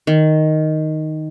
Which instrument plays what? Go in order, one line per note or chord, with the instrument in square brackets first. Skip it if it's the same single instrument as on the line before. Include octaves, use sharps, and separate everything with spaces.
[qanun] D#3